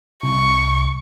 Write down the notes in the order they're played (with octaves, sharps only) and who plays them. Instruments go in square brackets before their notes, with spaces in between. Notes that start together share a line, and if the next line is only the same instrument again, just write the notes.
[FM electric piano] C2 [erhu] C#6